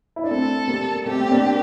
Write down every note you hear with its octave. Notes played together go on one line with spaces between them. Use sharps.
E4
D4
A3 C4 A4
G3 A#3
A3 C4 G4
C4
A#3 D4